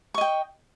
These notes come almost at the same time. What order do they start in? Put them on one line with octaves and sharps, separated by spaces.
C#6 D#5 G5